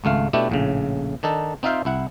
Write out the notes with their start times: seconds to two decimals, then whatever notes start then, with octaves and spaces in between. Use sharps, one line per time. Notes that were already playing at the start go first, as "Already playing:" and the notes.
0.04 G#1 C#2 A3 F5
0.33 B2 A3 D4 E4 G4
0.50 A#1 A2 C#3
1.23 D#3 D4 D#4 A4
1.63 C4 D#4 F4 E5 F5 G5
1.85 C2 E4 F#5